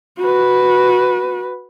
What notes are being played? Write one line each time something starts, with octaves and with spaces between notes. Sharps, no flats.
F#4 B4